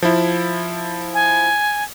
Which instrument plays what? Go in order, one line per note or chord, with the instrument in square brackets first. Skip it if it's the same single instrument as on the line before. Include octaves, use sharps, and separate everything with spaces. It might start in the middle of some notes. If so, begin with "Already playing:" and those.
[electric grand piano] F3 E4
[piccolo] G#5